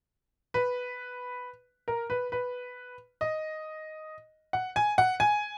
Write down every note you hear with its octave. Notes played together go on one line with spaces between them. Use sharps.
B4
A#4
B4
B4
D#5
F#5
G#5
F#5
G#5